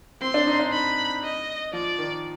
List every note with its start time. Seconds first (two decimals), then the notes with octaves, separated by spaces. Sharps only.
0.22 C4 C6
0.34 D4
0.47 D#4
0.60 D4
0.72 B5
1.23 D#5
1.73 F3 D5
1.99 D#3